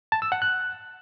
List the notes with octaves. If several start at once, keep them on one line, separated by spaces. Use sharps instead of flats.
A5
E6
F#5
F#6